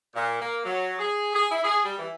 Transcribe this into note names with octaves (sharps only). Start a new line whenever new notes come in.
A#2
A#3
F#3
G#4
G#4
E4
G#4
G3
E3